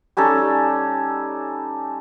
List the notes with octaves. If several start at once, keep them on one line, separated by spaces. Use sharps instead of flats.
G3 C#4 D#4 A4